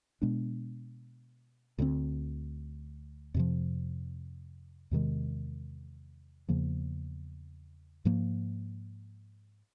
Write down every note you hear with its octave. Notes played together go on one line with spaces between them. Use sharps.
B2 G#3 B3 D4
D2 D3 G3 C4
F2 C3 F3
E2 C3 D#3 G#3
E2 C#3 F3 A#3
G#2 F3 A#3